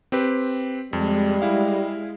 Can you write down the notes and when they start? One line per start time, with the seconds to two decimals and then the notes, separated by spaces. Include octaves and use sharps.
0.12 C4 G4 B4
0.93 F2 G3 G#3
1.42 E4 F5